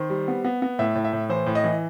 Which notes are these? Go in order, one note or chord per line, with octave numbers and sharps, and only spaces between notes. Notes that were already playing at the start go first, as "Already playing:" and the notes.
Already playing: D#3 C5
G3
B3
B3
B3
A2 E5
A2
E5
A2
E3 C5
A2
D#5
E3